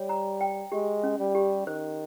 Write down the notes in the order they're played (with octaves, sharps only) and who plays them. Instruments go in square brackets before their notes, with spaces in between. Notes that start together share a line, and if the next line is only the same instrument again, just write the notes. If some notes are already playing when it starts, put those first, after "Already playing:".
Already playing: [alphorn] G3 [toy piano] C#5
[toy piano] A#5
G5
[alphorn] G#3 [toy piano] G4
[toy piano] C#4
[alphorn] G3
[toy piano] G4
[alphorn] D#3 [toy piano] C5